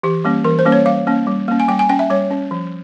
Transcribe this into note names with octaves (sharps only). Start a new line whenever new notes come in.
E3 G4
G3 A#3 C#4
E3 A#4
C5
G3 A#3 C#4
C#5
G3 F5
A#3 C#4
G3
A#3 C#4
G#5
G3 G5
G#5
C#4 G5
E5
G3 C#5
C#4
F3